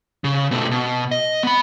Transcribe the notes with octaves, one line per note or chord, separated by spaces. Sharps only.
C#3
B2 A3
B2
D#5
B3 B5